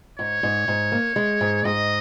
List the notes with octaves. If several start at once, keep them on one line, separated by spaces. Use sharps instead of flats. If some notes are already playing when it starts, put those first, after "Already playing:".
G#2 C#5
G#2
G#2
A#3
G#3
G#2
G#2 D#5